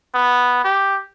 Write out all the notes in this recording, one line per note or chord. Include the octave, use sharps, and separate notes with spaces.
B3
G4